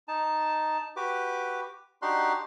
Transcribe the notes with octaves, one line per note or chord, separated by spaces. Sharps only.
D#4 A5
F#4 G4 B4 D6
D4 D#4 F#4 G4 C6 F#6